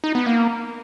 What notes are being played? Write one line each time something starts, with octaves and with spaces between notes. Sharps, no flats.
D#4
B3
A#3